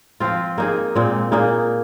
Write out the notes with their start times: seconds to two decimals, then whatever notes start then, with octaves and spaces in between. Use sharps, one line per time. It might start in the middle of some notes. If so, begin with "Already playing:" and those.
0.20 F3 C4 F4
0.58 A#3 D#4 G#4
0.95 A#2 G#3 C4
1.32 A#2 A#3 D#4 G#4